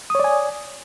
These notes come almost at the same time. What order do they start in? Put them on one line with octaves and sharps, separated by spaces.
D#6 C#5 D5 G#5